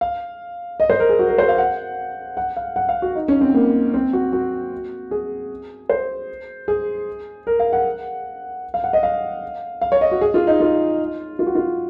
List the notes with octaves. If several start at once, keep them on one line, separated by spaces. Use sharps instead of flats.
F5
D#5
C5
A#4
G#4
F#4
A#4
C5
F5
F#5
F#5
F5
F#5
F5
F#4
D#4
C#4
C4
A#3
C4
F#4
F#4
G#4
C5
G#4
A#4
F5
F#5
F5
F#5
D#5
F5
F5
C#5
D#5
F#4
G#4
F4
D#4
F4
F4
F#4
F4